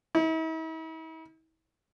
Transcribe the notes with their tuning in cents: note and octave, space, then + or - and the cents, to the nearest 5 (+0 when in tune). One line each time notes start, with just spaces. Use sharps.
E4 -45